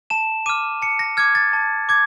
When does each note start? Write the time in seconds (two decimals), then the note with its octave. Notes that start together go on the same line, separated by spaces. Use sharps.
0.10 A5 E7
0.46 D6 F6 D#7
0.82 A5 C#7
0.99 A#6
1.17 D6 F6 G#6
1.35 A6
1.53 A5
1.89 D6 G#6